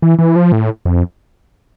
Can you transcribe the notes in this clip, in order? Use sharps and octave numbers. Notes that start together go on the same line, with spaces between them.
E3
E3
F3
A2
F2